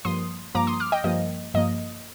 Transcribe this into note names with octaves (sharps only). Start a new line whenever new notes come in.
G2 F3 A#3 C6 D#6
G2 F3 A#3 A#5 D6
C6 D#6
D6 F6
D#5 G5
G2 F3 A#3 D#5
G2 F3 A#3 D#5